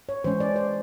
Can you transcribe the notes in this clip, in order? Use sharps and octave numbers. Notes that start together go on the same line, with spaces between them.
C#5
E3 G#3 C#4 C5
D5
C5